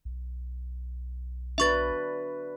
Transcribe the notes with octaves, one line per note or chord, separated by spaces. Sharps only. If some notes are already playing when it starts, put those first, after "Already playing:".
B1
D4 F#4 B4 E5 C#6 A6